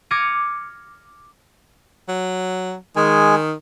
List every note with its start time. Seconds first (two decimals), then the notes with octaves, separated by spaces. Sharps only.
0.11 D6 F6 G#6 A#6 C#7 D#7
2.08 F#3
2.96 D#3 G#3 G#5